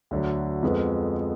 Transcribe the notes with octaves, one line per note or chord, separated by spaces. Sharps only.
D2 D3 F#3
F2 F3 G#3 B3